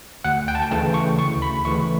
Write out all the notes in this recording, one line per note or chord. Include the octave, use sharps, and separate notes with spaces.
D2 F#5
G5
A5
G5
C#3 E3 A3 A5
C#6
D2 C#6
B5
C#3 E3 A3 C#6